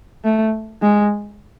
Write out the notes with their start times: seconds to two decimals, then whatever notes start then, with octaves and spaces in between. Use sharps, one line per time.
0.24 A3
0.82 G#3